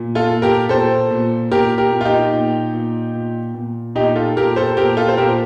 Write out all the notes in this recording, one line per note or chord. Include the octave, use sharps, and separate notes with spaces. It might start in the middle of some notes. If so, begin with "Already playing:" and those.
Already playing: A#2
F4 A4
A#2
G4 A#4
A#2 A4 C5
A#2
A#2 G4 A#4
G4 A#4
A#2
F4
D#4 G4
A#2
A#2
A#2
A#2
A#2 D#4 G4
F4 A4
A#2 G4 A#4
A4 C5
A#2 G4 A#4
F4 A4
C5
A#2 G4 A#4